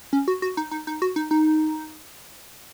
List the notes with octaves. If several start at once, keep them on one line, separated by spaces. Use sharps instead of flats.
C#4
F#4
F#4
D#4
D#4
D#4
F#4
D#4
D#4